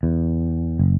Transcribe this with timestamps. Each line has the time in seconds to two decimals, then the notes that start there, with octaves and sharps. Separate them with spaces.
0.03 E2
0.79 F#1